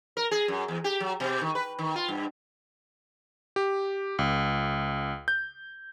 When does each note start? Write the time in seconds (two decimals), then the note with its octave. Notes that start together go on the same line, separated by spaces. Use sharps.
0.17 A#4
0.31 G#4
0.48 F#2
0.68 E2
0.84 G4
1.00 F#3
1.20 B2
1.41 D#3
1.55 B4
1.79 D#3
1.96 F4
2.08 G2
3.56 G4
4.19 C#2
5.28 G6